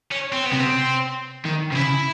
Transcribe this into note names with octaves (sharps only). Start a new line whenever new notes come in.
C#4
C4
B3
C3
C4
D#3
C3
C#3 E4